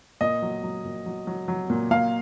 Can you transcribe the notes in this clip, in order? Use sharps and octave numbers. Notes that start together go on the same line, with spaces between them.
A#2 D#5
F#3
F#3
A#2
F#3
F#3
F#3
A#2
A#2 F5